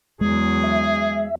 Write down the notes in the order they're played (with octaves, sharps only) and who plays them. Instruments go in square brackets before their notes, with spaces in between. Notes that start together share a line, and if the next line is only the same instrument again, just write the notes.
[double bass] E2 F#3 [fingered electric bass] G#3 [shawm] G#4
[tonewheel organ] E5